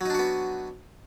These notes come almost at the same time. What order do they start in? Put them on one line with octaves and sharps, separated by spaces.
F#3 D#4 D4 F#4 B3